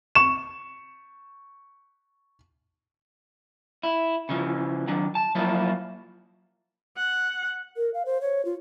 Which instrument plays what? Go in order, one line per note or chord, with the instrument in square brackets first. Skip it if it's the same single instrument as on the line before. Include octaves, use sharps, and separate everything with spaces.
[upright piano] C#6 E7
[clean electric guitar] E4
C#3 E3 F3
D#3 F#3 D4
A5
F3 F#3 A#3 E4 F4
[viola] F#5
[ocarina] A#4
F5
C5
C#5
F4